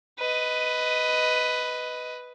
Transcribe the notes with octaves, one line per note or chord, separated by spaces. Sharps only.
B4 D#5